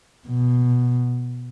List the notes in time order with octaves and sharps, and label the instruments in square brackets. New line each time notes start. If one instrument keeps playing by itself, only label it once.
[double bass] B2